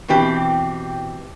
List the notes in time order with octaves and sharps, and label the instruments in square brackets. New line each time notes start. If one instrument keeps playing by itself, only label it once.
[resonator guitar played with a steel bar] B2 E3 C4 G4